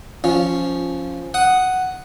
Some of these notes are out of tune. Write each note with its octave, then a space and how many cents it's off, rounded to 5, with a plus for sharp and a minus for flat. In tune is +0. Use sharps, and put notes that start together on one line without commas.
F3 +0 C#4 +0
F#5 +0 D#6 +0